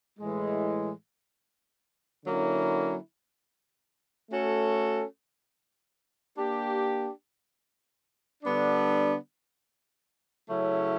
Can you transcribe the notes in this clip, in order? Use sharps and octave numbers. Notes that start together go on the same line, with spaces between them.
A2 E3 G#3
D3 F#3 A#3 C#4 E4
A3 C#4 F#4 A4
A#3 D4 G4
D3 G3 B3 D4
C#3 F#3 A3 C#4 E4